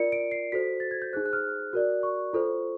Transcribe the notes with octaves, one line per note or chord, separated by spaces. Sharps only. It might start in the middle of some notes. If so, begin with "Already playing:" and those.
Already playing: F4 A#4 D5 C#7
D7
C7
F#4 A4 C5 B6
A6
G#6
G6
D#4 G#4 C5 F#6
F#6
F6
F#4 A#4 D5 F#6
C#6
F4 A4 C5